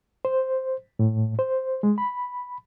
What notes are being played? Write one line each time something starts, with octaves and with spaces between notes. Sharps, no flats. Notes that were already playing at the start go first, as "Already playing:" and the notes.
C5
A2
C5
G#3
B5